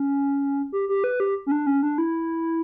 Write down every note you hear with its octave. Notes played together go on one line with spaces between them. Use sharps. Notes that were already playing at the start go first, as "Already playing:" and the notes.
Already playing: C#4
G4
G4
B4
G4
C#4
D4
C#4
D4
E4